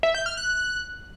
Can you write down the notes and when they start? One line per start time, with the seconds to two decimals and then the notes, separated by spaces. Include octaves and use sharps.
0.03 E5
0.15 G6
0.26 F6
0.37 F#6